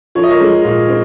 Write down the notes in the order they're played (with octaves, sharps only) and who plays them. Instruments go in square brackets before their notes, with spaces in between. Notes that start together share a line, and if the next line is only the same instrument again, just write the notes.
[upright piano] F3 [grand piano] C#5
[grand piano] D#5
A#4 C#5
[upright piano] G#3
A#2
C4